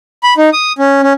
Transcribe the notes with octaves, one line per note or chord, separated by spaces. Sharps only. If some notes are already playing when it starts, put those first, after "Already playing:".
B5
D#4
D#6
C#4
C#4